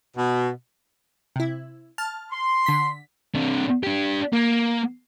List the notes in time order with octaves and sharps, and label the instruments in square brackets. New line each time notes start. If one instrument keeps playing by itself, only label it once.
[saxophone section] B2
[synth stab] C3 E4
A5 F6
[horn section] C6
[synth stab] D3 B6
[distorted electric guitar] C3 D4
D4 G4
A#3